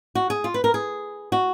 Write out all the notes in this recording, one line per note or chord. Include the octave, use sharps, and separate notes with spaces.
F#4
G#4
F4
B4
A#4
G#4
F#4